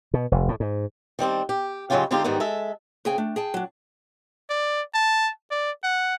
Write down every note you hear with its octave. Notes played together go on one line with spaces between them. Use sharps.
B2
F1
A2
G#2
D#3 G3 C4 D4
G4
C#3 F#3 G#3 C#4 F4 G4
D3 G#3 C4 D#4 F4 G4
G#2 D#3 G3 B3 D#4
G#3 A4 E5
C#3 C4 G#4 G5 G#5
A3 D4
G#4 G5 A5
F#3 D4
D5
A5
D5
F#5